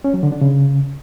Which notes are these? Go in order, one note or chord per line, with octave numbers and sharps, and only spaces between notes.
C#4
F#3
D3
D4
C#3